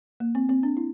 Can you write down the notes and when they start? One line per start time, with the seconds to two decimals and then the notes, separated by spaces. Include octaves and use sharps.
0.20 A#3
0.35 C4
0.49 C4
0.63 D4
0.77 E4